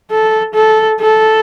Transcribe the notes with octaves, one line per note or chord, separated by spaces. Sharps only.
A4
A4
A4